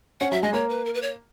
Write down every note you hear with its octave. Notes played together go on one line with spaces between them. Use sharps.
C#4 F#5
F#3 E5
G#3 D#5
A#3 C#5
B4
A#4
B4
C#5